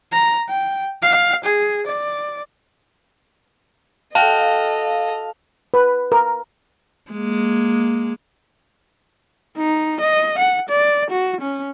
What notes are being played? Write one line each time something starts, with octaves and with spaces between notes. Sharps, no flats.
A#5
G5
F5
G#4
D5
F#4 A4 D#5 F5 G5 A5
B4
A#4
G#3 A#3
D#4
D#5
F#5
D5
F#4
C#4